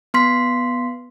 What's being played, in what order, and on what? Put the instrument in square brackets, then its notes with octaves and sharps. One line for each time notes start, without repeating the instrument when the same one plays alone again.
[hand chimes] B3 C6 B6